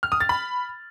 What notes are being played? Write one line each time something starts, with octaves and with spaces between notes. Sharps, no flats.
F6
D#6
A6
B5